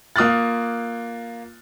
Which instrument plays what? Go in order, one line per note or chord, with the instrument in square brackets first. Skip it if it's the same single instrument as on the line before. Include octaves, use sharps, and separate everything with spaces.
[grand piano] A#3 F4 D#6 F6 F#6 A6